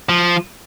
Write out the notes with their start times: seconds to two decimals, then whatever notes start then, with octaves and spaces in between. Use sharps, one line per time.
0.09 F3